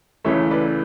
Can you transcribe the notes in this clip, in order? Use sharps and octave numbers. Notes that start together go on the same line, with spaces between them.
C#2 C#3 E3 A3 C#5 E5
B4 D5